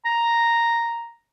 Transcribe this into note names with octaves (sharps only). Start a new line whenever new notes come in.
A#5